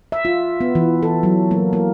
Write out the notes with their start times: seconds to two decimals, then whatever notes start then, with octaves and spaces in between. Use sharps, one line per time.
0.12 E5
0.25 F4
0.61 B3
0.75 E3
1.03 A4
1.23 F#3
1.51 A#3
1.73 A#3